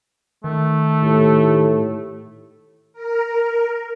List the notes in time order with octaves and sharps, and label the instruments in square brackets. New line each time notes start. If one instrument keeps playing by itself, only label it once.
[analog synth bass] D#3 [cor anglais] A3
[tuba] A2 [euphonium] G4
[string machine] A#4